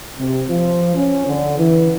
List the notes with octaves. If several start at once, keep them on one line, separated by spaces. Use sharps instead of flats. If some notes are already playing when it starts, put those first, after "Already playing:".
C3
F3
C#4
D3
E3